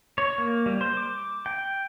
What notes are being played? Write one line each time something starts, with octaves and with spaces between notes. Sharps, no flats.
C#5
A#3
G3
C5
D6
G5